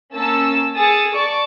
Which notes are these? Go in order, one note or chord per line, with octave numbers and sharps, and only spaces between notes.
A#3 C#4 A5 E6
G#4 D#6 E6 A6 C#7
D5 A5 C#6 D6